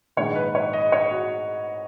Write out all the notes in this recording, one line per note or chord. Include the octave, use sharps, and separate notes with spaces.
A#1 G#2 D#3 G#3 C#5
B4
C#5
D#5
C#5
F#4